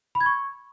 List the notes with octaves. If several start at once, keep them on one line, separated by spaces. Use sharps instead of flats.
B5
G#6
C#6